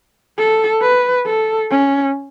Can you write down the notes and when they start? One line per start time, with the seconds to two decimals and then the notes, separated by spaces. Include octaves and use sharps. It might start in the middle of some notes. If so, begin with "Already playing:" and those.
0.38 A4
0.82 B4
1.26 A4
1.71 C#4